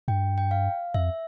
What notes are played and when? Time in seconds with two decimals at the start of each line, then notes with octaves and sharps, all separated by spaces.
0.08 G2 G5
0.38 G5
0.51 F5
0.94 F2 E5